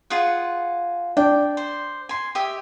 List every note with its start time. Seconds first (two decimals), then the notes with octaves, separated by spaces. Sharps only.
0.10 F4 G#4 F#5
1.17 D4 G5
1.57 C5
2.09 G#5 C6
2.35 G4 D#5 E5